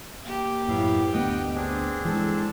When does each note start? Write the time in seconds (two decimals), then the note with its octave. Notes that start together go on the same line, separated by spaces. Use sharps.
0.25 A#3 G4
0.68 F#2 A2 B3 E5 F5
1.13 D2 G2 A3 B3 D#5 F#5 G5
1.55 C4 D4 G#4
2.05 E3 G#3 A4